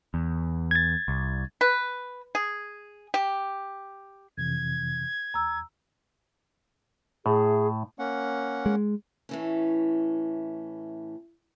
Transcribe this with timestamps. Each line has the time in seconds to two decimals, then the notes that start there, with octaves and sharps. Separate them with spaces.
0.14 E2
0.71 G#6 A6
1.08 C2
1.61 B4
2.35 G#4
3.14 G4
4.38 F2 C3 E3 G#6
5.34 E2 A#5 E6
7.26 A2 G#4
7.99 A#3 C#4 F#5
8.66 G#3
9.29 A2 E3 C#4